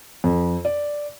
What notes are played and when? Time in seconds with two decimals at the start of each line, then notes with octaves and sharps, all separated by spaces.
0.24 F2
0.65 D5